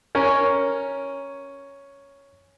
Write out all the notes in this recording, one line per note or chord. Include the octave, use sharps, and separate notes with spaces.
C#4 A#4